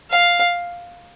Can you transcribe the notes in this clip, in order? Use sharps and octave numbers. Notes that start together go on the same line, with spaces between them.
F5